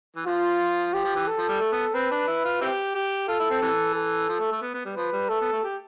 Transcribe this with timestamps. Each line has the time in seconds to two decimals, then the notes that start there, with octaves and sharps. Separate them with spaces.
0.16 E3
0.26 F3 F4
0.94 F3 G4
1.05 F3
1.16 E3
1.28 A4
1.39 F3
1.49 G3
1.61 A3
1.72 B3
1.94 C4 B4
2.11 D4
2.28 E4
2.45 F4
2.61 C4 E4 G4
2.95 G4
3.28 F4 A4
3.40 E4
3.50 C4
3.62 C3 E3
3.95 A4
4.29 F3
4.40 A3
4.51 A3
4.62 B3
4.74 B3
4.85 G3
4.96 F3 B4
5.12 G3
5.29 A3 A4
5.41 B3
5.52 A3
5.63 G4